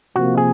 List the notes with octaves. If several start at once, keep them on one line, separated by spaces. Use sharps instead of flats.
C3 F3 A#3 F#4
G#4